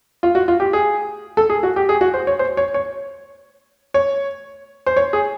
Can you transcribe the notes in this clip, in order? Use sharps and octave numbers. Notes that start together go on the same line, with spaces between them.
F4
F#4
F4
G4
G#4
A4
G#4
F#4
G4
G#4
F#4
C5
C#5
C5
C#5
C#5
C#5
C5
C#5
G#4